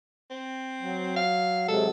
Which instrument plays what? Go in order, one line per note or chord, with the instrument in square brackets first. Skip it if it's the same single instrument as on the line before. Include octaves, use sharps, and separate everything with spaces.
[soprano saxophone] C4
[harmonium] F#3
[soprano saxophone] F5
[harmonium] C3 F#3 G#3 [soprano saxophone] A4